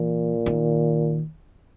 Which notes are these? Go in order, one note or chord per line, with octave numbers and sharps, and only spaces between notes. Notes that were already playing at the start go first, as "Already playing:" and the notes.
Already playing: A#2 E3
D#3